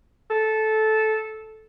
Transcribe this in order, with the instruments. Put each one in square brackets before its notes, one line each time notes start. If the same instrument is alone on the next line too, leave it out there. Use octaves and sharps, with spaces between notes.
[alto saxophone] A4